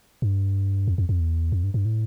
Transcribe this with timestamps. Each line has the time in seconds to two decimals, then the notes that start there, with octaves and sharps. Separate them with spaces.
0.22 G2
0.88 F2
0.98 F2
1.09 F2
1.20 E2
1.52 F2
1.64 G2
1.74 G2
1.85 A2